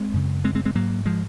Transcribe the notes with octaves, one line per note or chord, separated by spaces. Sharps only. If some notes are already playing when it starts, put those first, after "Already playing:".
Already playing: G#3 C4
F#2 C#3
G#3 C4
G#3 C4
G#3 C4
G#2 F#3 A#3
F3 G#3